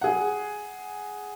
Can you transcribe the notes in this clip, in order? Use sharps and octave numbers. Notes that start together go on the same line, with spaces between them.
G#4 F#5